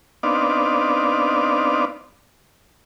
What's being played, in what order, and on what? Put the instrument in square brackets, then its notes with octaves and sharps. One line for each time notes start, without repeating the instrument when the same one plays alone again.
[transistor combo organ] B3 C4 D4 D#4 D5 F5